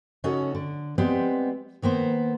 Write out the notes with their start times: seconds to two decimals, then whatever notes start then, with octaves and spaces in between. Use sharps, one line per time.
0.24 C#3 C#4 D#4 F#4 A4
0.55 D3
0.98 G3 G#3 B3 C4 G4
1.82 D#3 A#3 B3 C5